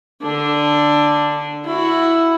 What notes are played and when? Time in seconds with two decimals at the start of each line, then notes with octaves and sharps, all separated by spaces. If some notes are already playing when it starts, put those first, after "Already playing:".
0.22 D3 D4
1.65 E4 F#4